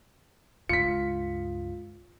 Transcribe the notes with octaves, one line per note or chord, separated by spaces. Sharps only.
C#2 G2 F4 B6 C#7